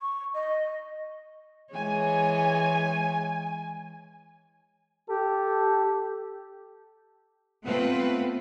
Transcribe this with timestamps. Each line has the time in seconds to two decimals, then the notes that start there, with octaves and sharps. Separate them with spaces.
0.01 C#6
0.34 D#5
1.73 E3 G#3 C#5 G#5
5.10 G4 A4
7.65 A3 B3 C4 F4 B4